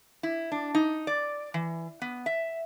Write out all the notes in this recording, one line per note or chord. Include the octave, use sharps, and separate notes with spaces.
E4
D4
D#4
D5
E3
B3
E5